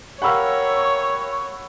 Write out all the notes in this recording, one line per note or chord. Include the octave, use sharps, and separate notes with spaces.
G4 A#4 C#5 F5 F#5 B5 C#6 E6